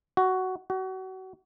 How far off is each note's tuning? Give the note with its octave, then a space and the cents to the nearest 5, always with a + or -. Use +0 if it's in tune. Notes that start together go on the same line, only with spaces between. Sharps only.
F#4 +10
F#4 +30